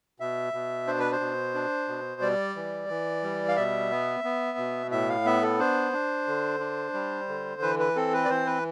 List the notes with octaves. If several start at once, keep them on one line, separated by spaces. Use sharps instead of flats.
B2 E5
B2
D4 C5
B4
C5
B2
D4
B2
G3 D5
E3
E3
G3
F5
B2 E5
B3
B3
B2
A2 E5
F5
B3 E5
A4
D4 C5
D4
D3
D4
G3
D3
E3 B4
B4
C4 A4
B4
D5
E3 C5
B4